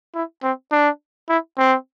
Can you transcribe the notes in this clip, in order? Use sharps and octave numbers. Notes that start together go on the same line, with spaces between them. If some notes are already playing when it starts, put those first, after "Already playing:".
E4
C4
D4
E4
C4